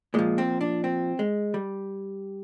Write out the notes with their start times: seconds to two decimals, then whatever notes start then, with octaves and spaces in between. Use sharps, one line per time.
0.14 A#2 F3 G#3
0.38 C4
0.61 D4
0.84 C4
1.19 G#3
1.54 G3